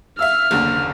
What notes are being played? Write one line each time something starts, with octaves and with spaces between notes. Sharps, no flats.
E5 F5 E6 F6
F#1 D#2 D3